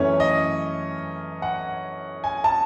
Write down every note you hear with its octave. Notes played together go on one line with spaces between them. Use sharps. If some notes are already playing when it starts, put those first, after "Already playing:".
Already playing: F#2 E3 A3 C#4 C#5
D#5
F#5
G#5
A5